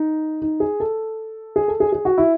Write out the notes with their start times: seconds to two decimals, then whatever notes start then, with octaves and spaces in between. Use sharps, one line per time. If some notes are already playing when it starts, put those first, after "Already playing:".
Already playing: D#4
0.42 D#4
0.60 G#4
0.80 A4
1.56 G#4
1.68 A4
1.80 G#4
1.92 G#4
2.05 F#4
2.18 E4